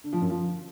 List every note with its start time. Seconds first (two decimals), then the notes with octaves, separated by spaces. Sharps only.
0.04 D3
0.13 F3
0.21 F#2
0.30 F3